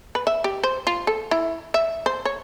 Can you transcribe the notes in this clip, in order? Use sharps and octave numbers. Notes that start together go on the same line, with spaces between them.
B4
E5
G4
C5
F4
A4
E4
E5
C5
C#5